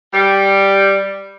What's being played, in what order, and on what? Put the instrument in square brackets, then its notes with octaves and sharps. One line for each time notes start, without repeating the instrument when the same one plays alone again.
[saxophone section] G3